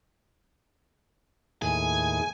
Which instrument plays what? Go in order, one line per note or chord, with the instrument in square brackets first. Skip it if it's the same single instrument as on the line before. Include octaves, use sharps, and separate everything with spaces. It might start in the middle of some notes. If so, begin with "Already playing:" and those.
[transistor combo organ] D#2 A2 G#4 [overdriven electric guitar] G#5